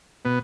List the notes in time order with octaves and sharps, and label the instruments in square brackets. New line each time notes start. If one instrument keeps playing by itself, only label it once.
[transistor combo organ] B2 B3